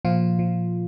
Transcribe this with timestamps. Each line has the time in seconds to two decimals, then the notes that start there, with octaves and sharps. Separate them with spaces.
0.05 A#2 F3 F4
0.39 F3